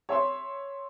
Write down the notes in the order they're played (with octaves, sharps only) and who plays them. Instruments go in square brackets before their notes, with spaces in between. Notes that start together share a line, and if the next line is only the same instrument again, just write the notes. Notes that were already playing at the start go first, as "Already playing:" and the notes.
[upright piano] C#5 E5 C6